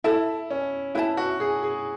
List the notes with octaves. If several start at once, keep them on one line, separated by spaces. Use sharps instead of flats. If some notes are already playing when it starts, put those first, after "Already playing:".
E4 A4 E5 A5
C#4
E4 B4 E5 A5
F#4
G#4
G#4